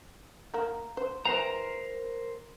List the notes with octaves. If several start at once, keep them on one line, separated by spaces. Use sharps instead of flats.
A#3 A#4
C5
E3 A#4 C5 G5 A#5